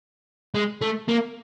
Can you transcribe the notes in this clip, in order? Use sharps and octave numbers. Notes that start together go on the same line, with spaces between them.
G#3
A3
A#3